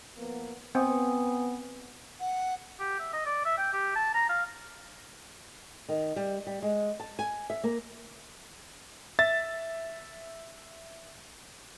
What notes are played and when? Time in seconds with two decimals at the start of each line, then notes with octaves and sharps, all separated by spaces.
0.17 F3 A#3 B3
0.75 B3 C4 G5 G#5 D#6
2.20 F#5
2.79 G4
3.00 E5
3.13 D#5
3.26 D5
3.46 E5
3.58 G5
3.72 G4
3.96 A5
4.14 A#5
4.29 F5
5.89 D#3
6.16 G3
6.47 G3
6.62 G#3
7.00 A5
7.19 G#5
7.50 E5
7.64 A#3
9.19 E5 A6